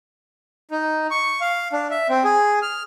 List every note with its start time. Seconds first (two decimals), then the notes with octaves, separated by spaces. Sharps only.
0.71 D#4
1.11 C#6
1.41 F5
1.72 D4
1.91 E5
2.09 C4
2.24 G#4
2.62 F6